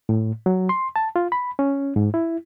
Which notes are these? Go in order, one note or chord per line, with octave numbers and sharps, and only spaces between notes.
A2
F#3
C6
A5
F4
B5
C#4
G#2
E4